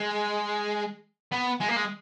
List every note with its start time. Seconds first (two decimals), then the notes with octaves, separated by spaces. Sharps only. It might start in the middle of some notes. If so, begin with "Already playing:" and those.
Already playing: G#3
1.32 B3
1.60 G#3
1.68 A#3
1.76 G#3